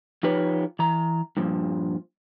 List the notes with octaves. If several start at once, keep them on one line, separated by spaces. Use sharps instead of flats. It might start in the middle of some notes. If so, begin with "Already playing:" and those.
F3 D#4 F4 G4 B4 C#5
E3 A#5
G2 A#2 F3